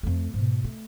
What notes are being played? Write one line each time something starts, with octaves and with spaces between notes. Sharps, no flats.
F2 A3
G#2 B2
A3